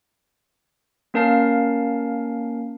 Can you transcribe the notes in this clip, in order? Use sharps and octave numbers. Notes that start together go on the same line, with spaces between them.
A#3 C#4 A#4 F5 A5 C7